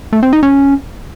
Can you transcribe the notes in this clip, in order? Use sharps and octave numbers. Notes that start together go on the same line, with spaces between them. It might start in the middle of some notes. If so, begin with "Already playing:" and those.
A3
C4
D#4
C#4